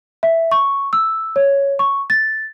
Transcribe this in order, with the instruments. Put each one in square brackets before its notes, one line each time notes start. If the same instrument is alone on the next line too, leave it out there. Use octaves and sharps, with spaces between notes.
[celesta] E5
C#6
E6
C#5
C#6
A6